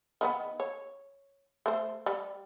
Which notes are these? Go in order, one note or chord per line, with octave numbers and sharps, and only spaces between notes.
D#3 F3 B3
C#5
A3 C5
G3